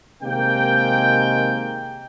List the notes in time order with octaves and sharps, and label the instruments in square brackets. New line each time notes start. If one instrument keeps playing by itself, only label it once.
[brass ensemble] C3 D#3 G#3 A#3 G5